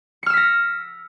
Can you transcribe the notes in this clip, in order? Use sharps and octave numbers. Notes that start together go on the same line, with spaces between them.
E6 F6 A#6 B6 C#7